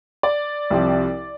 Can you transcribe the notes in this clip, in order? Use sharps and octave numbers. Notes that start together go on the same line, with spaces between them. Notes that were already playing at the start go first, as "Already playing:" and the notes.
D5
C2 C3 F3 C4